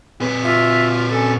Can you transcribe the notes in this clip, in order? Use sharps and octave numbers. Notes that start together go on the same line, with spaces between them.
A#2 B4
F4 E5
C#4 A4